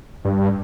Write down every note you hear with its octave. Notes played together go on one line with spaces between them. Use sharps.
G2